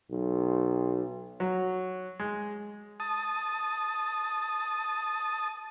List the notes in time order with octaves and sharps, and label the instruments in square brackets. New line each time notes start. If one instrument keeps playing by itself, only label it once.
[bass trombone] B1
[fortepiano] F#3
G#3
[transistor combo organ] A5 D#6